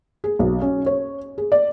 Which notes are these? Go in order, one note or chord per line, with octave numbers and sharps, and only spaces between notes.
G#4
B1
C#4
C#5
G#4
D5